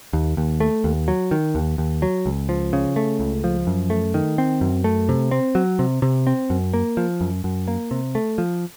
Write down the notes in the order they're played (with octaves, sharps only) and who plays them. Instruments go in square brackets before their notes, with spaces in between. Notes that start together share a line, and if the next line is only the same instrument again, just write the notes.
[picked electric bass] D#2
D#2
A3
D#2
F#3
D#3
D#2
D#2
F#3
C#2
F3
C#3
A3
C#2
F3
F#2
A3
D#3
C4
F#2
A3
C3
C4
F#3
C3
C3
C4
F#2
A#3
F3
F#2
F#2
A#3
C3
A3
F3